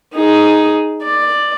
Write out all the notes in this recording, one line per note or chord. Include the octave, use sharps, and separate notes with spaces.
D#4 G#4
D5